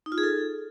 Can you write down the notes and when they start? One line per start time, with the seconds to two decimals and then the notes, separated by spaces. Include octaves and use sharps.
0.06 D#4
0.12 F4
0.18 G#4
0.23 A4